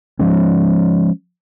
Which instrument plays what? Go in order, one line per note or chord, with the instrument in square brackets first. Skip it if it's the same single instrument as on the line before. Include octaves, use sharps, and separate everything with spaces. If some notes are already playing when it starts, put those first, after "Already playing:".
[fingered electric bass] F3 G#3 C#4